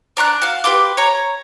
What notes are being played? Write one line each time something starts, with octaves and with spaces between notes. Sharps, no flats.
D4 A#5 C#6 F#6
F#4 F5
G4 B4 C6 D6
C#5 A#5